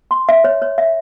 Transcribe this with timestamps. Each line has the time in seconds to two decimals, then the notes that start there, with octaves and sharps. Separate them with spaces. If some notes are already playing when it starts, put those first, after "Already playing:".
0.11 C6
0.29 E5
0.44 C#5
0.62 C#5
0.78 E5